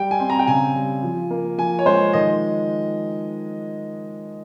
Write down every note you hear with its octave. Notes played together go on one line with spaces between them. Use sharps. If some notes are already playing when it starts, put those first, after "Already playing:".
Already playing: G3 G5
G#5
C4
A#5
G5
C#3 G#5
G3
F3
A#3
F3 G#5
C#5
G#3 C5
D#3 D#5